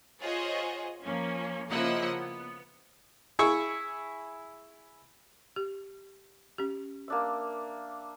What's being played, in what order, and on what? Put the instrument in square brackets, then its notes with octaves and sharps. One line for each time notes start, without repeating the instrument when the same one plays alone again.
[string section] F4 G#4 C5 C#5 D#5 F#5
F3 A#3 C#4
C#3 F3 A#3 E4 D#5 F#5
B3
[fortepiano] E4 G#4 E5 C#6
[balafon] G4
C#4 G4
[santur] A#3 D4 E5